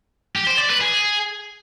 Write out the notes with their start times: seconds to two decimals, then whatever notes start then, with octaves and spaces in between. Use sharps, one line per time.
0.35 G4
0.47 C5
0.58 D5
0.70 B4
0.81 G#4